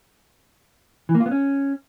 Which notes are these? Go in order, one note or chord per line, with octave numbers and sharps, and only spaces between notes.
E3
A#3
F4
B3
C#4